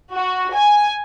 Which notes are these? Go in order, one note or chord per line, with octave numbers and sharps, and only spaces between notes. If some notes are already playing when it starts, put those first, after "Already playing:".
F#4
G#5